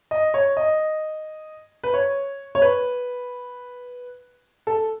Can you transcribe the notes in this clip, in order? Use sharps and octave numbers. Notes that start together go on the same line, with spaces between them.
D#5
C#5
D#5
B4
C#5
C#5
B4
A4